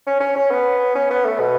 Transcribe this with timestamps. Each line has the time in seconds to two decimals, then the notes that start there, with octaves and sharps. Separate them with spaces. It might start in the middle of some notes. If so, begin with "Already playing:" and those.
0.07 C#4
0.21 C#4
0.36 C#4
0.51 B3
0.95 C#4
1.11 B3
1.25 A3
1.40 B2